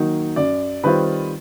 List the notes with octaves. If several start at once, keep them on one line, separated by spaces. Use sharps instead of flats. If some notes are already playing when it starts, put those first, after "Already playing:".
Already playing: D#3 F#3 A#3 D#4
F#2 D5
D#3 G3 C4 F4 B4